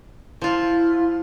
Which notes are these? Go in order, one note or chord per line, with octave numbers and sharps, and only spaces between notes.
F3 E4 F4